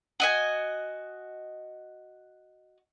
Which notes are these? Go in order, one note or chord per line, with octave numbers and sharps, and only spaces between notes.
F#4 D#5 G#5